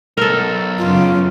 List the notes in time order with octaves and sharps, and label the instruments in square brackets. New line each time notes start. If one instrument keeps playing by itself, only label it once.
[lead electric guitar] B1 G#2 [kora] A4 A#4
[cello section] F#2 C#3 [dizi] F4